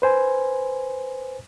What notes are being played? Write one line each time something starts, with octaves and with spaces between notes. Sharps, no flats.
B4 C5 G#5